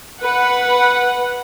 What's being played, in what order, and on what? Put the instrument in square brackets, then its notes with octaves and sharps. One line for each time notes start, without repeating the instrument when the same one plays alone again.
[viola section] B4 F#5